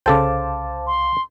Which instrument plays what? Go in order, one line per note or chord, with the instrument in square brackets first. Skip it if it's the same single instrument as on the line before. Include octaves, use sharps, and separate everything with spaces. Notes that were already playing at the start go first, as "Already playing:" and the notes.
[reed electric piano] C2 F5 D6 [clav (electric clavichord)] C#3 A4 G5 [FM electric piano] C5 A5
[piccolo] C6